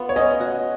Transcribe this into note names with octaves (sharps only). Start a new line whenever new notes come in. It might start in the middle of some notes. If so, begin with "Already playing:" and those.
Already playing: B3 F4
C#5
C#4 D#5
F#4